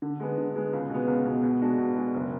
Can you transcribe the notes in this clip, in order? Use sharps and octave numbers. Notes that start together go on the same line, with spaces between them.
D3
G#3 B3
D3
G#3 B3
C#2
B2 G#3 B3
C#2
B2 G#3 B3
B2
G#3 D4 F#4
B2
G#3 D4 F#4
F#1